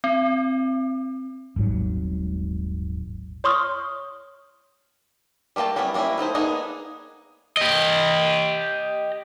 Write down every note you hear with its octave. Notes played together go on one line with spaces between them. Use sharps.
C4
D#1 G#1 G#2 F#3
C#5 C6 C#6 D#6 F6
G3 A3 A#3 G5 A5
G3 A#3 B3 C#4 E4
G3 A#3 B3 C#4 E4
A3 D#4 E4 C5
A#3 B3 D4 D#4 G#4
G4 D#5